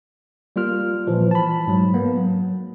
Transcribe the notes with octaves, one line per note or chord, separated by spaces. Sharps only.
G3 A#3 F4 F6
A#2 E3 F3
A5 B5
G#2 F#3
A#3 B3
F#3